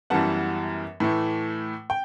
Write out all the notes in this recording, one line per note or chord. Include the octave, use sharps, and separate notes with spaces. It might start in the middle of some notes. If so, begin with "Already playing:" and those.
F#2 E3 G3 B3 F#5 A5
A2 E3 A3
G5